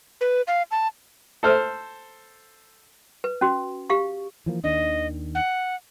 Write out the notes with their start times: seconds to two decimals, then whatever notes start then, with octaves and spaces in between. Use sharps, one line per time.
0.21 B4
0.48 F5
0.71 A5
1.43 A4 C5 F6
3.24 B4
3.41 C#4 F#4
3.90 G4 F5 C#6
4.46 E3 F3 A#3
4.64 D#2 D#3 D4 D#5
5.35 F#5